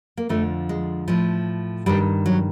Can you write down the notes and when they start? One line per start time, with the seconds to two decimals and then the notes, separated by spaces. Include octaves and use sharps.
0.17 A#3
0.29 F2 D3 F3 A3
0.69 G#3
1.08 A2 F3
1.86 G2 D#3 G3
2.26 F#3